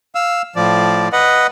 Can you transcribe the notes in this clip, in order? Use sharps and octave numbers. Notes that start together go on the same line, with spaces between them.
F5 E6
A2 F3 D5
B4 D#5 F#5